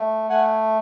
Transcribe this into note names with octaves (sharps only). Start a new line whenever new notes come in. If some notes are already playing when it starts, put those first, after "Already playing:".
Already playing: A3
A3 F#5 G#5